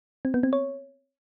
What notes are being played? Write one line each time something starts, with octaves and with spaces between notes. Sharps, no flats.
C4
B3
C4
C#5